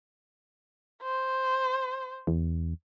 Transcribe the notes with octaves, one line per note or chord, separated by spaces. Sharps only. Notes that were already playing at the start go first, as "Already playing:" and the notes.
C5
E2